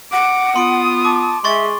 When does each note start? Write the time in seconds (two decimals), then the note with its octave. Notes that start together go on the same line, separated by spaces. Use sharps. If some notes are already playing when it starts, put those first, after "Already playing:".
0.12 F#5 D6
0.56 B3 F4 C6 D#6 D7
1.05 A5 D6
1.44 G#3 G#4 E5 C6 C#6 A6